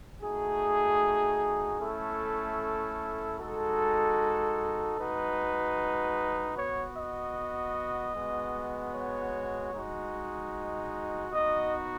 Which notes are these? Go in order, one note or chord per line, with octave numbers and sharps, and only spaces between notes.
A3 D#4 F#4 G#4
A3 C#4 E4 A4
G#3 D#4 F#4 A4
G#3 D#4 F#4 B4
B3 F#4 C#5
D#5
G#3 B3 F#4
C#5
G#3 D#4 F#4
B3 D#4 F#4 D#5